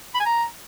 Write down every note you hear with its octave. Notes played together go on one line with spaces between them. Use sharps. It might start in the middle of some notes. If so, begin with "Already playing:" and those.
B5
G#5
A#5